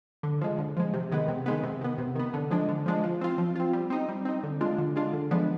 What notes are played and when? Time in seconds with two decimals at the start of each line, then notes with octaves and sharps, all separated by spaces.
0.23 D3
0.41 F3 G#3
0.58 D3
0.77 F3 G#3
0.94 C3
1.12 D#3 G#3 B3
1.28 C3
1.46 D#3 G#3 B3
1.63 C3
1.81 D#3 B3
1.98 C3
2.15 D#3 B3
2.33 D3
2.51 F3 G#3 D4
2.68 D3
2.86 F3 G#3 D4
3.03 F3
3.21 C4 F4
3.38 F3
3.56 C4 F4
3.73 G3
3.90 C4 D#4
4.09 G3
4.25 C4 D#4
4.43 D3
4.61 G#3 D4 F4
4.78 D3
4.96 G#3 D4 F4
5.13 D3
5.31 F3 G#3 B3 D4